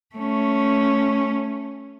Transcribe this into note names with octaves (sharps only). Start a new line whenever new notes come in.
A3 C#4